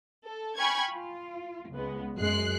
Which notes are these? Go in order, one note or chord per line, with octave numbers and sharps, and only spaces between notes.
A4
G5 G#5 B5 C#6 F6 G#6
F4
C#2 G#3 B3
F#2 G#3 F#6 C7